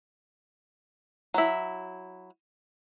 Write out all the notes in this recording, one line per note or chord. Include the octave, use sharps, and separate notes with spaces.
F#3 E4